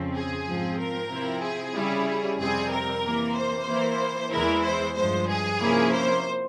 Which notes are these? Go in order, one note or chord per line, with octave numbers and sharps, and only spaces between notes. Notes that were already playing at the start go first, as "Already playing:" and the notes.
Already playing: F2 C#3 F3 C4
G#4
G#2 F3 C4
A#4
C3 F3 C4 E4
G#4
C#3 G3 C#4 E4
F2 C3 G3 C4 G#4
A#4
C3 E3 A#3
C5
E3 A#3 E4
E2 E3 G#3 E4 A#4
C5
G2 F3 G#3 C5
G#4
C3 F3 A#3 C#4 E4
C5